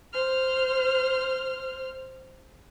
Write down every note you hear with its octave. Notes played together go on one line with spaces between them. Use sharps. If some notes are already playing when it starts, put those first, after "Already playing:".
C5 F6